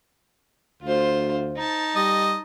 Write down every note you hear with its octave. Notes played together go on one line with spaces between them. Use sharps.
D2 F4 C5
D#4 A5
G3 D#5